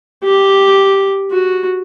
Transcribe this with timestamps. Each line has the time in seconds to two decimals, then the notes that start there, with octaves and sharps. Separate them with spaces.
0.24 G4
1.31 F#4